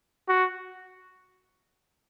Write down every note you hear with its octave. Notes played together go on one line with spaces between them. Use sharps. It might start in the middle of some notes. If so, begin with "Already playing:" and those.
F#4